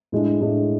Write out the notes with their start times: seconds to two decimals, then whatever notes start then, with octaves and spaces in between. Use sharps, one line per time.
0.12 A2 G#3 D4
0.41 A2 G#3 D4